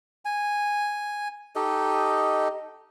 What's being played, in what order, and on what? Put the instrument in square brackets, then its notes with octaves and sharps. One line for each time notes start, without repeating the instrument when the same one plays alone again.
[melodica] G#5
D#4 G4 A4 D#5